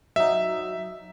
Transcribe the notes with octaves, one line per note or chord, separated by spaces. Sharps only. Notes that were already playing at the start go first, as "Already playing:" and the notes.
F#3 D#4 E5